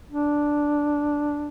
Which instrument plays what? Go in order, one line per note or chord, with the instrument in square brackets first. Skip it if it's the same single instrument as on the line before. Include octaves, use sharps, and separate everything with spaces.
[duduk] D4